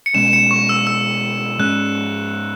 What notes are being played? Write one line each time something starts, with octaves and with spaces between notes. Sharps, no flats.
C#7
B2 G#3 C#4 E7
E7
C#7
C#6
E6
E6
G#2 G#3 C#4 F#6